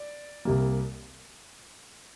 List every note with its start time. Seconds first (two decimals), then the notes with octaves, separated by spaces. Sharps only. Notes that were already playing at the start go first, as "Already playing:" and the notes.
Already playing: D5
0.45 C2 C3 G3 A#3